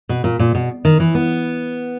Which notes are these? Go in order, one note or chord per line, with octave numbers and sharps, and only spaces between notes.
B2
A#2
A#2
B2
D#3
E3
B3